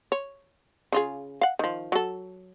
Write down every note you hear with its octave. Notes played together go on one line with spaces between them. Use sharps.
C#5
C#3 F4 G#4
F5 F#5
D#3 F3
F#3 A4